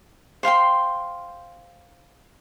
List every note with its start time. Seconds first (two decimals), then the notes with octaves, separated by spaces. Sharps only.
0.43 C5 F5 G5 C6